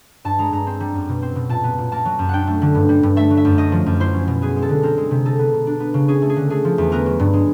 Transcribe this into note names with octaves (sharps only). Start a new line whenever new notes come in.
G2 A5
G#3 A#5
G2 A#5
C4
G3
F#2
B2
C4
B2
A#2 A5
B3
A#2
A#3 A5
F#3
F#2
D4 F#5 G5
A3
D3
G2
G3
G2
A3 E5
F#3
E5
F#2
A3 D#5
F3
F#2
E4 C5
C#4
B2
B3 G#4
G#3
A4
D3
C4 A#4
G#3
C3
D#4 A4
B3
B2
D4
B3
C#3
C#4 G#4
A3
G#4
D3
A3 G#4
F3
E2
B3 A#4
F#3
G2
G#3